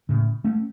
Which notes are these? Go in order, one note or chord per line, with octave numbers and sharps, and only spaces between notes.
A2 C#3
A3 C#4